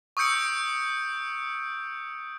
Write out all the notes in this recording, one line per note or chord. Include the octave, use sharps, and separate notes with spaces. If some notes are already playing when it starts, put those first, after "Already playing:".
C#6 D#6 E6 G6 C#7 D7